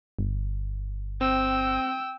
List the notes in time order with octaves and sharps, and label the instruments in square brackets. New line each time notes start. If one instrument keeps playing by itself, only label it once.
[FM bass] G1
[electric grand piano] C4 [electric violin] G5 E6